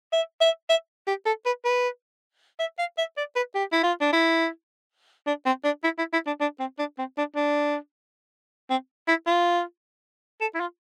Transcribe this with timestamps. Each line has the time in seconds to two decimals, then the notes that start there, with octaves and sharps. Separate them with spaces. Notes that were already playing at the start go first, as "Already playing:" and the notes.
0.13 E5
0.41 E5
0.70 E5
1.08 G4
1.26 A4
1.46 B4
1.65 B4
2.60 E5
2.79 F5
2.98 E5
3.17 D5
3.36 B4
3.55 G4
3.73 E4
3.84 F4
4.01 D4
4.13 E4
5.27 D4
5.46 C4
5.65 D4
5.84 E4
5.99 E4
6.13 E4
6.27 D4
6.41 D4
6.60 C4
6.79 D4
6.99 C4
7.18 D4
7.36 D4
8.70 C4
9.08 E4
9.27 F4
10.41 A4
10.55 E4
10.60 F4